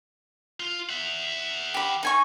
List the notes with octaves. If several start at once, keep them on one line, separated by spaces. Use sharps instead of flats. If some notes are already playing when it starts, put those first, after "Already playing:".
F4
E5 F#5
G4 B5
D#4 G#5 C#6